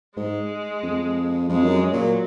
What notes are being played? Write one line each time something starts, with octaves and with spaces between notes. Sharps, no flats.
G#2 G#3
F2
F2 G#3
F#2
A#2 F#3